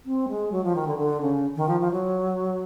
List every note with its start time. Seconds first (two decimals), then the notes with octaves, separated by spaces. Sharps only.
0.05 C4
0.29 G#3
0.52 F#3
0.64 F3
0.75 D#3
0.87 D3
0.98 D3
1.21 C#3
1.56 D#3
1.68 F3
1.80 F3
1.91 F#3